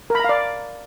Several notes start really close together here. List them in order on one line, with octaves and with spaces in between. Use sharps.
A#4 B5 A#5 F5 D5